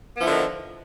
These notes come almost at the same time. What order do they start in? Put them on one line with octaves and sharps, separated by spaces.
B3 F3 E4 D3 D#3